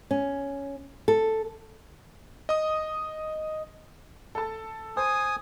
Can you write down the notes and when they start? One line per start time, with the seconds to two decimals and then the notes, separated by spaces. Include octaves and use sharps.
0.11 C#4
1.08 A4
2.49 D#5 D#6
4.35 A4 A5
4.97 C5 G#5 D#6